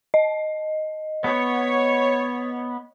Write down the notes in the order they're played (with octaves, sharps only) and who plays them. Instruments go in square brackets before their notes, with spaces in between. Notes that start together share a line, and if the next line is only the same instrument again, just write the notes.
[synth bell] D#5
[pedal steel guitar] B3 [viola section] C#5